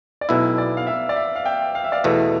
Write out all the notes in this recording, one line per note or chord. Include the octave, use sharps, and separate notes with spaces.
D5
B1 B2 A3 E4 E5
D5
F5
E5
D5
E5
F5
E5 G5
F5
E5
D5 F5
E2 B2 A3 E5